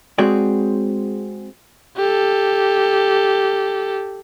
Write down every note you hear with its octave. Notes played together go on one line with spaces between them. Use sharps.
G#3 C4 F#4 G#4 C#5 D5
G4 A4